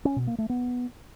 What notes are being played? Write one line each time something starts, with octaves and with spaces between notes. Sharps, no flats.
C#4
B2
A#3
A3
B3